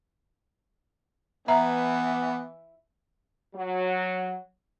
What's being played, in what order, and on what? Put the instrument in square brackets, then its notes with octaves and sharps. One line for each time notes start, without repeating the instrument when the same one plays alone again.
[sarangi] E3 [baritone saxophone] B3 [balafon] E5 A#5
[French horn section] F#3